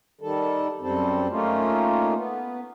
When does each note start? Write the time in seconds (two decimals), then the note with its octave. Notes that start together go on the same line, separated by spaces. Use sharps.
0.21 D#3 G3 A4
0.81 F#2 G3 C4 A4
1.30 A3 A#3 C#4 D#4 F4
2.15 B3